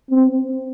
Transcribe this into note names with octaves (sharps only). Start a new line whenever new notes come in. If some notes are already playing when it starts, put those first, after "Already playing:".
C4